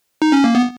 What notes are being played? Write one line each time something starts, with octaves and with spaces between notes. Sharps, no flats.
D#4
C#4
A#3
B3